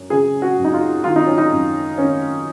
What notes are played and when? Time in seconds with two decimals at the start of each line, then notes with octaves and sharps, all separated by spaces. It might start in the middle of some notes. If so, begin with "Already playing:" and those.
Already playing: F#2
0.10 C#3 G#4
0.42 F#4
0.58 F#2
0.64 D#4
0.74 F4
1.04 D#3 F4
1.16 D#4
1.27 C#4
1.38 D#4
1.52 F#2
1.98 D#3 C#4